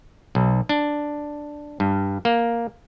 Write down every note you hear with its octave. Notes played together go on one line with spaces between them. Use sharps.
B1
D4
G2
A#3